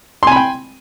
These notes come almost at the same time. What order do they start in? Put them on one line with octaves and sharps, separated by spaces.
C6 G#5 B5 G5